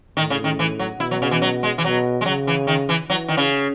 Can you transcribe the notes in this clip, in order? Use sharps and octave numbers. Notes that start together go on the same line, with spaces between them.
A2 D#3
C#3
D#3
E3
F#3
B2 E4
F#3
C#3
E3
F#3
G#3
E3
B2 F#3
G#3
C#3 F#3
E3
D#3
E3
E3 F#3
D#3
C#3